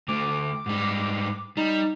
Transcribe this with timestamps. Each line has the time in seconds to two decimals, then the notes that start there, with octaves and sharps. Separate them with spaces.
0.08 D2 A3 D6
0.66 G#2 G3
1.57 G3 D#4